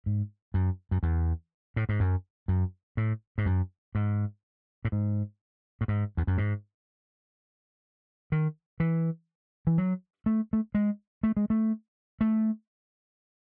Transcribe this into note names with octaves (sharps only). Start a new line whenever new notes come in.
G#2
F#2
F#2
E2
A2
G#2
F#2
F#2
A2
G#2
F#2
G#2
A2
G#2
A2
G#2
E2
F#2
G#2
D#3
E3
E3
F#3
A3
A3
G#3
A3
G#3
A3
A3